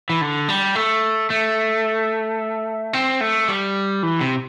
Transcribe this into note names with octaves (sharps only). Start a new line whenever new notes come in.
E3
D3
G3
A3
A3
C4
A3
G3
E3
C3